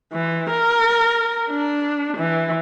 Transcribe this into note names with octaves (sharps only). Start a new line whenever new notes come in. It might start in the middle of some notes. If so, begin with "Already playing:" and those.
E3
A#4
D4
E3